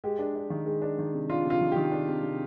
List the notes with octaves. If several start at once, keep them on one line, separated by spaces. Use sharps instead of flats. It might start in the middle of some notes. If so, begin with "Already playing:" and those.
G#3 G4
D4
D4
D#3
G#3
D4
D#3
C3
D4 F4
C3
F4
D#3
D#3 G4
D4
C3
C3